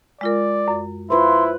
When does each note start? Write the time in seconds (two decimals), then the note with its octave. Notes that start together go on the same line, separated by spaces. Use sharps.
0.21 G#3 F4 A#4 D5
0.68 F#2
1.10 E4 F4 B4 C5 C6